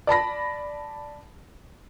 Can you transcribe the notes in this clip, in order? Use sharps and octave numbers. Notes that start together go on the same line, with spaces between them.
D5 A5 B5 A#6